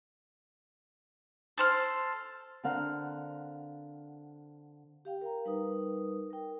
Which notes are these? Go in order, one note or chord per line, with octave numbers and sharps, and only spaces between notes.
A4 C5 F6
D3 C4 A#4 F5 F#5
G4 F5 G5
A#4 F5 G5 A#5
G3 D#4 A#4 B4 D#6
A#4 G5